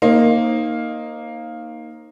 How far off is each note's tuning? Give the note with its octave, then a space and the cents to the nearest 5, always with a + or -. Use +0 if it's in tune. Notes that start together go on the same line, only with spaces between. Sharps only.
A#3 +0 D#4 +0 C5 +35